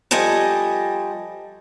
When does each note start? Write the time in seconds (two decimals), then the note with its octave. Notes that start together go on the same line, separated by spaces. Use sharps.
0.11 F3 G3 A4 D#5 G#5